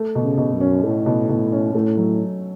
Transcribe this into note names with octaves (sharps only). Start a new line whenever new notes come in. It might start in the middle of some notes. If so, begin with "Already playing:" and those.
Already playing: A3
B2
C#3
B2
F#2
C#4
A2 A3
B2
B2
C#4
A2 A3
F#3